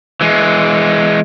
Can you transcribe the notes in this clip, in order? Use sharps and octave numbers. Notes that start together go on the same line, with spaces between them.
E3 G#3